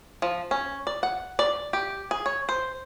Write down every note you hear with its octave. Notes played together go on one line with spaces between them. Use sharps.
F3
C#4
D5
F#5
D5
G4
G#4
C#5
C5